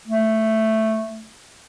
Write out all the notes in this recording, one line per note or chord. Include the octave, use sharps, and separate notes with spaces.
A3